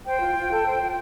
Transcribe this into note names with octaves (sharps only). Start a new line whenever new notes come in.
C5 G5
F4
F4
A4
C5
F4